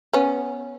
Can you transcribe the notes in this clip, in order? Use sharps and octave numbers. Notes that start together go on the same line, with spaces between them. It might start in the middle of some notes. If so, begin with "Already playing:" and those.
B3 C#4